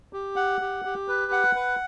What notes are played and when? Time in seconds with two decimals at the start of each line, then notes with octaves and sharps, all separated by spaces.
0.13 G4
0.36 F#5
0.61 G4
0.85 G4
1.08 B4
1.32 F#5
1.56 B4